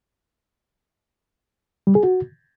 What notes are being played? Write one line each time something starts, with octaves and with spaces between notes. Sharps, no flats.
G3
G#4
F#4